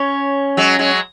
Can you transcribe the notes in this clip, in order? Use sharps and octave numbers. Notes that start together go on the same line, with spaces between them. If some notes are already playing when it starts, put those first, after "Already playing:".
Already playing: C#4 C#5
F#3 G#3
F#3 G#3